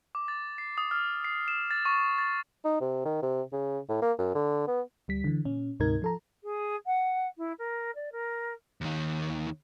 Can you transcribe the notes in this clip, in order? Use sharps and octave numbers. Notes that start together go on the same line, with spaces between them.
D6
A6
C7
D#6
F6
C7
E7
A6
C#6
A6
D#4
C3
D#3
C3
C#3
A2
A#3
F#2
D3
B3
D2 G3 B6
D3 E3
A#2 C#4
D2 G#2 C3 D#4 A#4 G#6
F3 A4 A#5
G#4
F#5
E4
A#4
D5
A#4
D#2 D#3